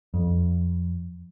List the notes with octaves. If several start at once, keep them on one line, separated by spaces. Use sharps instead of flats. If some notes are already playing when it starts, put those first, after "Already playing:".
F2